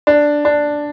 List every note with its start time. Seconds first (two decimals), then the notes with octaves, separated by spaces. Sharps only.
0.07 D4
0.45 D4